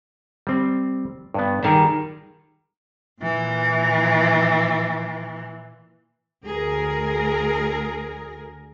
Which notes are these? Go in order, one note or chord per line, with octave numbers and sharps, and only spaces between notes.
G3 C4
G2 B3
D#3 G3 G#4 A#4
A#2 E3
D2 G#4 A#4